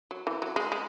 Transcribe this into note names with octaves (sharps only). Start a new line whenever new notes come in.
F#3
E3
F#3
G#3
G#3